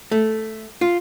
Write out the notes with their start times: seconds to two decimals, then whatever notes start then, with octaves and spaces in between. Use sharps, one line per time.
0.11 A3
0.81 F4